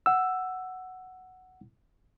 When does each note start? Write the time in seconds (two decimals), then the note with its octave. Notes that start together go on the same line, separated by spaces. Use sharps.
0.06 F#5 E6